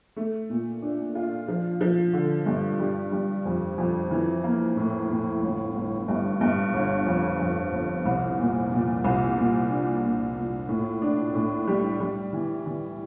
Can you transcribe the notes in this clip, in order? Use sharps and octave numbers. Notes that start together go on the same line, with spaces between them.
A3
A#2
D4
F4
F3
F3
D3
G2
G3
G3
F2
F2
E3
A#3
A2
A2
G1
G1
G2
G2
G1
F2
F2
G1
C2
A#2
A#2
C2
A#2
D4
A#2
A#2
A2
D4
A2
G3
G3
E3
E3